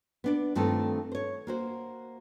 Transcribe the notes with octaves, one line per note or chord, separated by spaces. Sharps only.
B3 D4 D5
G2 D#3 A3 C4 F4 A4
C5 C#5
A#3 F#4 C5